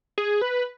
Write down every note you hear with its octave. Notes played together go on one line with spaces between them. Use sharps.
G#4
B4